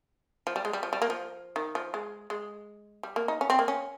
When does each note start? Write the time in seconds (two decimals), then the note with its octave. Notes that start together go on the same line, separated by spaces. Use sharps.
0.47 F3
0.56 G3
0.65 G#3
0.73 G3
0.83 F3
0.93 G3
1.02 A#3
1.10 F3
1.56 D#3
1.75 F3
1.94 G#3
2.30 G#3
3.03 G3
3.16 A#3
3.28 D#4
3.41 C#4
3.50 C4
3.59 A#3
3.68 C#4